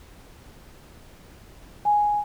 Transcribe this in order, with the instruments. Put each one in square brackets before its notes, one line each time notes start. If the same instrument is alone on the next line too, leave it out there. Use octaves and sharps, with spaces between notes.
[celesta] G#5